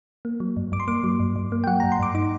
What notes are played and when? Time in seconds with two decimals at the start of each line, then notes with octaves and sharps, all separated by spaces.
0.25 A#3
0.40 F#3
0.57 G2
0.72 G2 D6
0.80 C6
0.88 A#3 D6
1.04 F#3
1.20 G2
1.36 G2
1.52 A#3
1.64 G5
1.67 F#3 F#5
1.80 A#5
1.83 G2
1.92 C6
1.99 G2 D6
2.14 D#4 D6